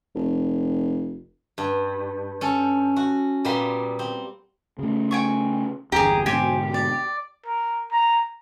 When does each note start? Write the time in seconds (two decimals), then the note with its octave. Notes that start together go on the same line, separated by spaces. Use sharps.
0.15 F1
1.58 G2
2.41 C#4 A4
2.96 F#4
3.45 A#2 G3 A#3 B3 C6
3.99 C4
4.79 C#3 A3
5.11 G5 G#5 C#6
5.92 G1 E2 G4 G#4 A#5
6.26 G#2 B2 D3 G4 C5 G#5
6.74 D5
7.46 A#4
7.91 A#5